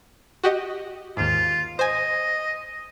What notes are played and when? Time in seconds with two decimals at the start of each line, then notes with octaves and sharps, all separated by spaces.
0.44 F#4 G4 D#5
1.17 D#2 G#2 F4
1.79 C5 D#5 G#5